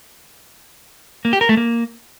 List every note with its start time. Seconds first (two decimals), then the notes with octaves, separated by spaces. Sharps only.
1.25 A#3
1.33 G4
1.41 A#4
1.49 A3
1.57 A#3